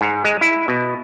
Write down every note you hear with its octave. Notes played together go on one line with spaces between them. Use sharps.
G#2
G#3
E4
B2